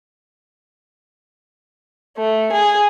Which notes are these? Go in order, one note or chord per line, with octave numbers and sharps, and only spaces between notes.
A3
G#4